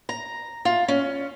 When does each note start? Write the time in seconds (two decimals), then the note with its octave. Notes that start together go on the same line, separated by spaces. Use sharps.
0.09 A#5
0.65 F4
0.88 C#4